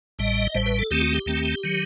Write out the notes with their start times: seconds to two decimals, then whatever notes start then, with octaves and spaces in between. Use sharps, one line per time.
0.19 A1 A2 G3 D#5
0.54 A1 A2 G3 C5
0.66 B4
0.79 A4
0.91 D#2 D#3 A3 C4 G4
1.02 F#4
1.14 G4
1.26 D#2 D#3 A3 C4
1.64 D#3 F#3